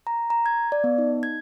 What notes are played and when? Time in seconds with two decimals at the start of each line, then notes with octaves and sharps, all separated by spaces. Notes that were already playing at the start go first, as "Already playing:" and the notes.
0.07 A#5
0.30 A#5
0.46 G#6
0.72 D5
0.84 B3
0.98 D#4
1.23 G#6